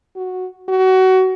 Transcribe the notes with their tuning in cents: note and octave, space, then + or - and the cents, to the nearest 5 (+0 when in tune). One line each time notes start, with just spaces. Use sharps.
F#4 -5
F#4 +25